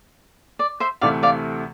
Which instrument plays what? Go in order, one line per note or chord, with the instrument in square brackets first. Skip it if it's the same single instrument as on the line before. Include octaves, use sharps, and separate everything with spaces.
[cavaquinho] D5
C5 E5
[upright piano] D2 C3 E3 A3 [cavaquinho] D5 F5
[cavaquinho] D5 F5